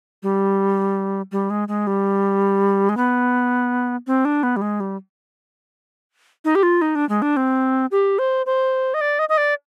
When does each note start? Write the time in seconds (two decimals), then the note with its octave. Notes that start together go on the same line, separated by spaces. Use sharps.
0.23 G3
1.32 G3
1.50 G#3
1.68 G#3
1.87 G3
2.89 G#3
2.97 B3
4.07 C4
4.25 D4
4.43 B3
4.56 G3
4.62 G#3
4.80 G3
6.45 D#4
6.55 G4
6.63 F4
6.82 D#4
6.95 D4
7.09 G#3
7.22 D4
7.37 C4
7.92 G4
8.19 C5
8.46 C5
8.94 D#5
9.01 D5
9.19 D#5
9.29 D#5
9.37 D5